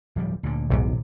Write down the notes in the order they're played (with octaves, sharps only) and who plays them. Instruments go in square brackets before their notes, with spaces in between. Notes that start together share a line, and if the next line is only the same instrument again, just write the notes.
[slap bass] D1 F3 G3
D2 A#2 D3
[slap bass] D#1 C3 [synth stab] B1 E2 G#2